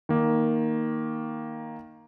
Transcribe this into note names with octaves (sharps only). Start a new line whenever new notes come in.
D#3 A#3